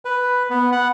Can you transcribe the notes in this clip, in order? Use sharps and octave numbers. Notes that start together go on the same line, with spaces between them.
B4
B3
F#5